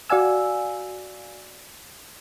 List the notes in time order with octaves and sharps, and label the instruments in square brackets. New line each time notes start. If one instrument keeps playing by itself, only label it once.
[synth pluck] F#4 D5 F5 G#5 E6